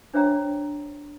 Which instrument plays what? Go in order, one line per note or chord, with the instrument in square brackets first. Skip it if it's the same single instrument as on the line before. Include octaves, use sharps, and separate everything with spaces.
[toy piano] D4 C5 C#5 E5 G5 A#5